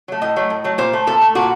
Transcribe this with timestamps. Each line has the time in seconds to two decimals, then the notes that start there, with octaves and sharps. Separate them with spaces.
0.08 F#3 A3
0.21 A2 D#5
0.36 F#3 A3
0.50 A2
0.64 F#3 A3
0.78 A#2 C5
0.93 A3
1.07 A#2 A4
1.22 A3
1.35 A#2 F#4